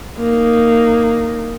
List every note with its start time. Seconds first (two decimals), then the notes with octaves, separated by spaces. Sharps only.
0.18 A#3 D#4